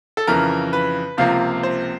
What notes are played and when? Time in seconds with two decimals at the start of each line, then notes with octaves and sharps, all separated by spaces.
0.17 A4
0.27 F2 C#3 E3 A#4
0.73 B4
1.17 C#2 C3 F3 A#3 F5
1.63 C5